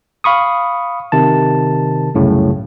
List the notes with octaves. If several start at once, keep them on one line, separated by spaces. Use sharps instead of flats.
F5 B5 C#6 D#6
C3 D#3 A5
C2 F#2 A2 C#3